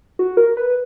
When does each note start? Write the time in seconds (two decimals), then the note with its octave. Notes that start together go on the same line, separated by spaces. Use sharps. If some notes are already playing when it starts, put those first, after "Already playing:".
0.19 F#4
0.37 A#4
0.57 B4